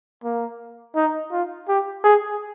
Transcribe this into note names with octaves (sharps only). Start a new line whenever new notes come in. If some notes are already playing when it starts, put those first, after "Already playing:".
A#3
D#4
F4
G4
G#4